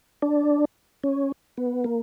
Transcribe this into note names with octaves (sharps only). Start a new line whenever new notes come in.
D4
C#4
B3
A#3